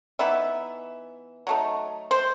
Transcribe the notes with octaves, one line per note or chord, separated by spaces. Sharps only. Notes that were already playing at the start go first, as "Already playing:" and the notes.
E3 B3 D#4 E5
F#3 A3 D#4
C5